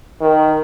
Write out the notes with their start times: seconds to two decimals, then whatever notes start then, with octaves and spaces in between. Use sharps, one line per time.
0.21 D#3